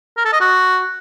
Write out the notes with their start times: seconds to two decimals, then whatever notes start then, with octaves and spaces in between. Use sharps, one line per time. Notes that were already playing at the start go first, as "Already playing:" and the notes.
0.17 A#4
0.25 A4
0.33 D#5
0.41 F#4